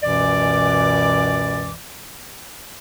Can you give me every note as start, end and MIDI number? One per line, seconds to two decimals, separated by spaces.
0.03 1.73 37
0.03 1.73 42
0.03 1.73 47
0.03 1.73 52
0.03 1.73 74
0.03 1.73 86